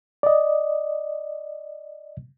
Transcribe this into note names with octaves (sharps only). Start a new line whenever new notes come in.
D5 D#5